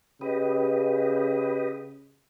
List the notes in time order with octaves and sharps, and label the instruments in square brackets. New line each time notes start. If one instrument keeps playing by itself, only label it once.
[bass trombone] C#3 [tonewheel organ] G4 B4 D#5